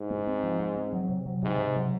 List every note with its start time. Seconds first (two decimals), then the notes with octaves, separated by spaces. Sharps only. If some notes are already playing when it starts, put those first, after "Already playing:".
Already playing: G#2
0.10 G#3
0.27 C4
0.43 F3
0.60 G#3
0.76 C4
0.93 F#3
1.09 C3
1.26 F#3
1.43 G#2 C3
1.59 C3
1.76 F#3